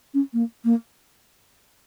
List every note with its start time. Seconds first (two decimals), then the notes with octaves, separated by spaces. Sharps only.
0.14 C#4
0.33 A#3
0.65 A#3